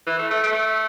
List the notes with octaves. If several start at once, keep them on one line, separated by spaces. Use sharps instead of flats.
E3
A3
A3
A3